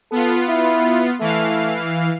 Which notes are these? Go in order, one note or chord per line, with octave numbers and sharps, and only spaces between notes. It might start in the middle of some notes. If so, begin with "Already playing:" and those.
B3 F4 A4
E4
E3 A3 F5